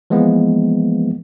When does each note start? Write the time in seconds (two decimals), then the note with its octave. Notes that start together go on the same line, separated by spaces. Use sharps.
0.10 E3 F3 G#3 A#3 B3